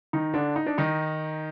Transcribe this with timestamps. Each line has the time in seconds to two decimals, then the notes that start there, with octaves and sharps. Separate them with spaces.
0.13 D#3 D#4
0.34 D3 D4
0.56 D#4
0.66 D4
0.78 D#3 D#4